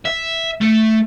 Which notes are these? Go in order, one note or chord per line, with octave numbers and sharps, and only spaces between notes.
E5
A3